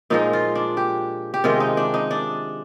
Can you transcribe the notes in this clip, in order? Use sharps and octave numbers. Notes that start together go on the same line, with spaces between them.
A#2 F3 G#3 D#4
F4
D4
G4
G4
C3 D#3 G#3 F4
D#4
D4
D#4
D4